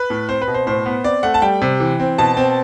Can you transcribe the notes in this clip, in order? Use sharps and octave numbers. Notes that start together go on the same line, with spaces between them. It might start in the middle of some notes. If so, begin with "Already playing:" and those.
Already playing: B4
A2
C4 C5
B4
B2
C5
A2 C5
B3
C4 D5
A3 F#5
A5
G3 G5
C3
E3
C4
B2 A5
C4